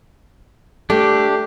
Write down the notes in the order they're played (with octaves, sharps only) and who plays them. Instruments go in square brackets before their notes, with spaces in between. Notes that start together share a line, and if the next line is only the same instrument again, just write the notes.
[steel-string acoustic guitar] A3 [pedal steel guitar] D4 [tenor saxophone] G4